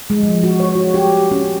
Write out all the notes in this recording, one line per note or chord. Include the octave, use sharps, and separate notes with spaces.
G#3
F3
F#4
C#5
F#4
G4
C#4